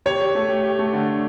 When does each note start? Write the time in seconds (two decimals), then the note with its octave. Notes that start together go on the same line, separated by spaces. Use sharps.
0.06 G4 C#5
0.21 G4
0.35 A3
0.49 G4
0.64 G4
0.79 A3
0.93 D3
1.08 D3